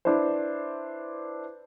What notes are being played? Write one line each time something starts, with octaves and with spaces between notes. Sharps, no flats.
D4 E4 B4 C5